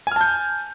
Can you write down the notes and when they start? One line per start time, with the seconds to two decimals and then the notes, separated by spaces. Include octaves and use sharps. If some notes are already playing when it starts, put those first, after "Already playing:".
0.07 G#5
0.12 F6
0.16 A5
0.21 G6